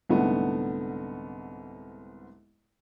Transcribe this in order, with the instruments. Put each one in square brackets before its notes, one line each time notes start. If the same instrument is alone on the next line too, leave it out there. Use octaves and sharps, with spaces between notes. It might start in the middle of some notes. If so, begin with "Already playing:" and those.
[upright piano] C2 G#2 D3 A3 B3